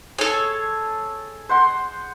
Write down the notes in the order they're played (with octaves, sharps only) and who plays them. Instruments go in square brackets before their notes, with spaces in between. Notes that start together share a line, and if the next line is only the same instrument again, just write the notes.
[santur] G#4 [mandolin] A4 C#5
[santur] C5 F#5 C6